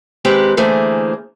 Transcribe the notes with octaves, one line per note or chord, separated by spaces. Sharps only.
D#3 G#3 C4 G4 B4
D3 E3 A3 A#3 G#4 C5